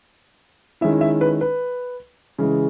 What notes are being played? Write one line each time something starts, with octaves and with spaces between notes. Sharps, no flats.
D#3 G#3 C#4 E4 E5
E5
B4
B4
C#3 E3 G#3